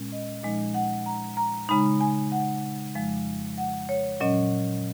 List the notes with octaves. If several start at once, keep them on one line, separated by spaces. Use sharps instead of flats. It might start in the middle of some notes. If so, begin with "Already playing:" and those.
Already playing: A#2 G#3 C#4
D#5
A#2 F3 G#3 D#4 D#5
F#5
A#5
A#5
C#3 G#3 D#4 B5
G#5
F#5
F2 F3 G#3
F#5
C#5
A#2 F#3 C#4 D#5